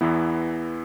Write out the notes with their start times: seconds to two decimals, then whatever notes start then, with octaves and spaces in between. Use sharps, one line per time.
0.01 E2 E3 B3 E4